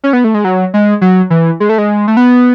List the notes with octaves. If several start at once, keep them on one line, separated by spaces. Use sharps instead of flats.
C#4
B3
A3
G#3
F#3
G#3
F#3
E3
G#3
A3
G#3
A3
B3